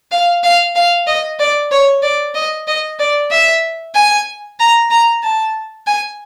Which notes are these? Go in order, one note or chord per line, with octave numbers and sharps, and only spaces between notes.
F5
F5
F5
D#5
D5
C#5
D5
D#5
D#5
D5
E5
G#5
A#5
A#5
A5
G#5